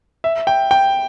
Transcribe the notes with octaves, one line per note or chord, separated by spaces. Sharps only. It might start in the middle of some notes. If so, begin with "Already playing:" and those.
E5
G5
G5